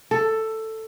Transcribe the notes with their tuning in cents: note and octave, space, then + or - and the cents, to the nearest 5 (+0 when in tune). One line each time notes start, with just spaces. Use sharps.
A4 +10